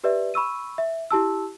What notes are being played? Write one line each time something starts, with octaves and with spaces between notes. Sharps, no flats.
G4 B4 D5 E5
B5 C#6 E6 D#7
E5
E4 G4 A5 E6